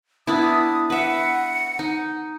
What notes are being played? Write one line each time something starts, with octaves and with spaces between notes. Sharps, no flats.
B3 D4 E4 D#6
B4 E5 F#5
D#4